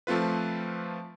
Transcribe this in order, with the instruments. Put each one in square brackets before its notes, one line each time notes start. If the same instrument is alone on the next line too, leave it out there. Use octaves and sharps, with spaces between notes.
[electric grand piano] F3 A3 C4 F4 B4